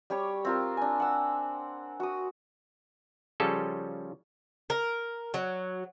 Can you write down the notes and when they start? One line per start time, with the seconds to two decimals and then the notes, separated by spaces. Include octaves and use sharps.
0.10 G3 G4 C#5 C#6
0.45 C4 F4 A#4
0.77 D4 G#5
1.00 F#5 E6
2.00 F#4 D#6
3.40 C#3 F3 G3 C#4 F4 A4
4.70 A#4
5.34 F#3